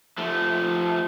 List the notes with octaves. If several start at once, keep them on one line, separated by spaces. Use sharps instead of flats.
F3 A3